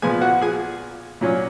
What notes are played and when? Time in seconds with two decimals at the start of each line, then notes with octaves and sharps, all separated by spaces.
0.02 A#2 F3 B3 G#4 G#5
0.22 F#4 F#5
0.41 G#4 G#5
1.21 A#2 F#3 C#4